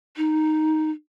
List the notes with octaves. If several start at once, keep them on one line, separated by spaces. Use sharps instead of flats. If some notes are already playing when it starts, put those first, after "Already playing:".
D#4